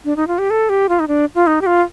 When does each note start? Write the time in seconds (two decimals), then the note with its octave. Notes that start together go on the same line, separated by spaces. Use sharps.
0.05 D4
0.16 D#4
0.28 F4
0.38 G4
0.50 A4
0.69 G4
0.89 F4
1.00 D#4
1.08 D4
1.35 F4
1.47 D#4
1.61 G4
1.66 F4